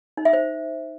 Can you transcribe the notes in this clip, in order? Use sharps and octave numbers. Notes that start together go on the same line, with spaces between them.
D#4
E5
C5